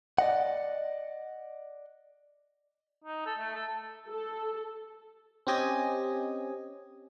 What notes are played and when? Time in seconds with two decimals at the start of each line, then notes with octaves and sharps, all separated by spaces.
0.18 D5 D#5 F#5
3.04 D#4
3.26 A4
3.39 A3
3.55 A4
4.09 A4
5.47 C4 C#4 G4 D#5 G#5